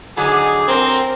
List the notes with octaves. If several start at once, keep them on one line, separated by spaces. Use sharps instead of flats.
D3 F#3 D#4 G#4 D6
C4 A#4